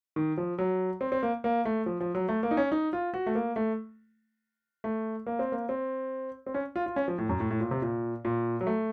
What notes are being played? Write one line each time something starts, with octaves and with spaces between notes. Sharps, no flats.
D#3
F3
F#3
C4
C4
A#3
A#3
A3
F3
F3
F#3
A3
A#3
D#4
C#4
D#4
F4
F#4
A3
A#3
A3
A3
A#3
C4
A#3
C4
C4
C#4
F4
F4
C#4
F3
A2
F#2
A2
A2
A#2
C3
A#2
A#2
F#3
A3